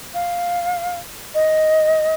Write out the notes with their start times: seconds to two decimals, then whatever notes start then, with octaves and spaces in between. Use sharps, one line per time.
0.14 F5
1.34 D#5